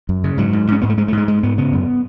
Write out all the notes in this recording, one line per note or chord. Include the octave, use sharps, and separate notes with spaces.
F#2
C#3
G#2 F#3
G#2
G#2 C#4
G#2 B3
A3
G#2 G#3
A3
G#2 G#3
G#2 G#3
G#2 B3
C#3 B3
F#2